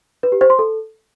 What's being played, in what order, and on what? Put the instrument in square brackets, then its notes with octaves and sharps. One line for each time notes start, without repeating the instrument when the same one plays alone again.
[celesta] B4
G4
C5
C6
A4